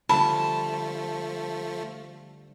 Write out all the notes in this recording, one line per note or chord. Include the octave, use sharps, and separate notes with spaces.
D3 F3 G3 A3 A5 B5